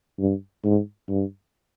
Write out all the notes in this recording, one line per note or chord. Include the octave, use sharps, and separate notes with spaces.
G2
G#2
G2